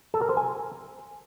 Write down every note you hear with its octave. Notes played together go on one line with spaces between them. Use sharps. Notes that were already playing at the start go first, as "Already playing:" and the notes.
A4
A#4
C5
G#5